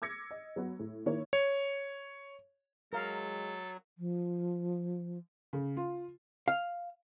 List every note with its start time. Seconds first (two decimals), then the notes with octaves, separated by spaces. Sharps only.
0.02 D6 E6 G#6 A#6 C#7
0.31 D#5
0.56 F#3 B3 F#4
0.79 A2
1.06 D#3 A#3 E4 C#5
1.33 C#5
2.93 F#3 G#3 A4 A#4 F5
3.98 F3
5.53 C#3
5.77 F4
6.48 F5